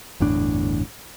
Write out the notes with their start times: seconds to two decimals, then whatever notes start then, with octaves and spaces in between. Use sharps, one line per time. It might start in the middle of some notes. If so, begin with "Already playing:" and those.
0.20 G1 E2 A2 D4